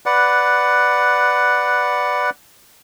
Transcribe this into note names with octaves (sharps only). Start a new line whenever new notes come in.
B4 D5 F#5